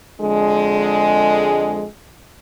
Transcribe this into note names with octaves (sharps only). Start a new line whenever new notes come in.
F2 D3 G#3